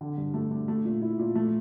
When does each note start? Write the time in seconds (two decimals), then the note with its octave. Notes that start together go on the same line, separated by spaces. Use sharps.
0.01 D3
0.17 G2
0.34 A3
0.51 D4
0.68 A3
0.85 A#2
1.01 E4
1.19 A#2
1.35 A3